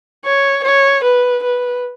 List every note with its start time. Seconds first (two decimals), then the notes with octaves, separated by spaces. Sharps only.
0.25 C#5
0.64 C#5
1.04 B4
1.43 B4